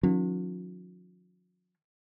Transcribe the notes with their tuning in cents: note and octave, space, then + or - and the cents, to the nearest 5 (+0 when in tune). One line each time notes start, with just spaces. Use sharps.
D#3 +0 F#3 -45 C#4 +0